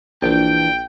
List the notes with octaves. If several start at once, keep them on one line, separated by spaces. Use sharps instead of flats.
A#1 E3 D4 G5